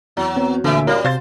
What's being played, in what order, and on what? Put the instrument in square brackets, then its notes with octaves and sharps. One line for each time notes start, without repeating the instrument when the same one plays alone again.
[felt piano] E2 [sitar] F#3
[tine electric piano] B3 C4
[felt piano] D2 A#2 D7 [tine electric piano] D3 E5 [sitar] E3
[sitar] G3 [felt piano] C#4 F4 C#5 [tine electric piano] A#4 F5
[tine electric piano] C3 [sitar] C5 [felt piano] F5 A6